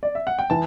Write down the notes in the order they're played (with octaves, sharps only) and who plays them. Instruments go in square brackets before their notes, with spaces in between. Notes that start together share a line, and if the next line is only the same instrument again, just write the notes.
[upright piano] D5
E5
F#5
G5
[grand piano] E3 [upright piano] A5